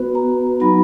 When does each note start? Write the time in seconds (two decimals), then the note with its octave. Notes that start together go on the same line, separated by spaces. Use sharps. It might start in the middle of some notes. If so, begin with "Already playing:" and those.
Already playing: B3 F#4 B4
0.15 A#5
0.60 F#3 B3 D#4 F#4 B5